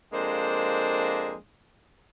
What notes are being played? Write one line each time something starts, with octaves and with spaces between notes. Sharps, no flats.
F2 G#3 A#3 D4 C5